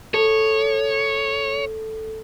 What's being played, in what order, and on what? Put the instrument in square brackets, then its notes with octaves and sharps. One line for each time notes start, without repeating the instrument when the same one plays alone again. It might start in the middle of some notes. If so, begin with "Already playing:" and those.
[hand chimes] A4 [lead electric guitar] C#5